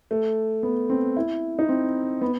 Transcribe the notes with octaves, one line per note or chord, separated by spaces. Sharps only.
A3
B3
C4
E4
D#4
C4
B3